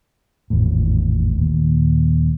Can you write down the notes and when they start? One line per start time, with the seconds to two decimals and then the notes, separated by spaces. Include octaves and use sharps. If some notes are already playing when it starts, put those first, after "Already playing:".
0.50 G#1 E2 A2
1.35 D#2 A#2